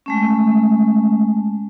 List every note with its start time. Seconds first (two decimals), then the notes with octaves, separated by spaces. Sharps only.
0.06 G#3 A3 C#4